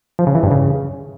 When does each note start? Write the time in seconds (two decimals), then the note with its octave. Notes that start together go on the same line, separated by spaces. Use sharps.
0.19 F3
0.27 C#3
0.35 E3
0.43 G2
0.51 C#3